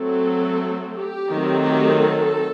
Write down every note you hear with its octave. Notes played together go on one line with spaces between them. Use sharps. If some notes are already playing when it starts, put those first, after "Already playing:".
Already playing: F#3 A3 C4 A4
G4
D#3 F#3 A3 C4
G4
A4